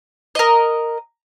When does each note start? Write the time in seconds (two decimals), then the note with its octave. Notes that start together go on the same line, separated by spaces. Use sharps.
0.35 A#4 D#5